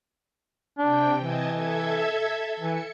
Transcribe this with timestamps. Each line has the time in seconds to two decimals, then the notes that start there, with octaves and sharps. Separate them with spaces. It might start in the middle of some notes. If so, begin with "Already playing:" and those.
0.78 C3 D4 G5
1.21 E3 D#5 A5 G#6
1.53 A4 E5 G#6
2.60 E3 C#7